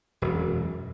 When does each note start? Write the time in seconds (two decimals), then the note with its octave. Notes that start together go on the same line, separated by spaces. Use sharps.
0.22 E1 F#2